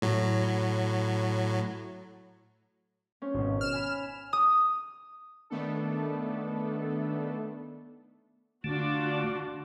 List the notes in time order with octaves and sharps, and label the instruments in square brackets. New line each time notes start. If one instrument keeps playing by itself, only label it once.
[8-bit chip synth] A2 F#3
[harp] C#4 C5
[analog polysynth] G#1 B2
F6 E7
[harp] G#5 B5
D#6
[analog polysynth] D#3 A3 B3 D4 A4
[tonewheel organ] D3 A3 [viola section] D4 F4 F#4